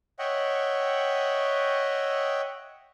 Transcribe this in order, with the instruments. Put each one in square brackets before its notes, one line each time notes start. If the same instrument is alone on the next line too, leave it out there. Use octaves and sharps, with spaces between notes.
[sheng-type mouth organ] C#5 D#5 E5 F#5 G5